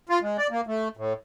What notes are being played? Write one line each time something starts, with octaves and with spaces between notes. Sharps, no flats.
F4
G#3
D5
A#3
A3
A2